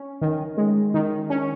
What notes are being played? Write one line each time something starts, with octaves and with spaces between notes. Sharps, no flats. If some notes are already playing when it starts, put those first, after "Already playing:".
Already playing: C#4
D#3
G#3
D#3
C#4